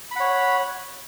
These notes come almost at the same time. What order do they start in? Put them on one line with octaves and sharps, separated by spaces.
B5 F#5 C#5